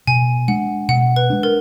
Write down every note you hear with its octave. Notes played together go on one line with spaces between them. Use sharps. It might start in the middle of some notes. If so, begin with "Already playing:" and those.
B2 G#5
G#3 D4 F#5
B2 F#5
B4
G#3 D4
A#4